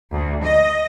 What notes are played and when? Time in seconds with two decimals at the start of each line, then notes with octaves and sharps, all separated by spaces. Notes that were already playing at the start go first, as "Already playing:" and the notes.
0.12 D2
0.43 D#5